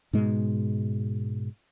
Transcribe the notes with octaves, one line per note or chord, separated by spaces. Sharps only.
G#2 B2 G#3